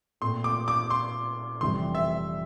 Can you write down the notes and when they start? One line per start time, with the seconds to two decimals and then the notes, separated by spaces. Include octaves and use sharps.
0.21 A#2 A3 C4 F4 C6
0.44 D6
0.68 D6
0.90 C6
1.61 F1 F2 C3 E3 G3 C6
1.95 E5